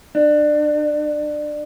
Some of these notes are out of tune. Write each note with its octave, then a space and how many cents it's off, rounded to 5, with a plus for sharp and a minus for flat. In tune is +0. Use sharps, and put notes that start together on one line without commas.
D4 +25